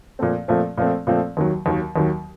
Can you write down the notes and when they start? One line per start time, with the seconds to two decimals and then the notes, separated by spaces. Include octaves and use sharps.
0.19 A#2 F3 A3 C4
0.48 A#2 F3 A3 C4
0.77 A#2 F3 A3 C4
1.07 A#2 F3 A3 C4
1.37 D#2 D#3 F#3
1.66 D#2 D#3 F#3
1.96 D#2 D#3 F#3